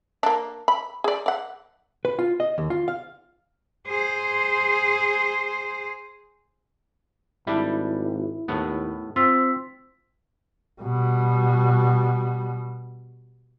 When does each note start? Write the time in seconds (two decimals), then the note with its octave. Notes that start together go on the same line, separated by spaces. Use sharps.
0.23 A#3 D4
0.68 B5
1.04 G#4 D5
1.26 D5 F#5
2.05 B4
2.19 F4
2.40 D#5
2.58 D#2
2.70 F4
2.88 F5
3.87 G#4 C5
7.47 G#1 G3 D4 E4
8.48 D#2 A2 B3
9.16 C4 F4 C6 E6 B6
10.81 B2 G3